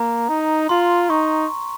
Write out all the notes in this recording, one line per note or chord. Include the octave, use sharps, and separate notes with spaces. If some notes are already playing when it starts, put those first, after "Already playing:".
Already playing: A#3 A#5
D#4
F4 C6
D#4 C#6